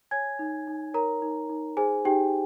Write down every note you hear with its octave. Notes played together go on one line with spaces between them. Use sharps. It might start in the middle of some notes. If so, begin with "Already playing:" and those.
C#5 G#5 G#6
D#4
D#4
A#4 C#5 A#5
D#4
D#4
G#4 C5 G#5
D#4 G4 G5